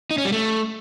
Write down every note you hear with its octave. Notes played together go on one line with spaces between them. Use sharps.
D#4
C#4
G3
A3